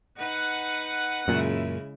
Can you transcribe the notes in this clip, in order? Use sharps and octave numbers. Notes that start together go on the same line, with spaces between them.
D#4 B4 F#5
F#2 A#2 C#3 G#3 E4